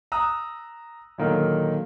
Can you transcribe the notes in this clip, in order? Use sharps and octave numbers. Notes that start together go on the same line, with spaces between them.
A#5 D#6 E6 F#6
A#2 D3 D#3 F#3 A#3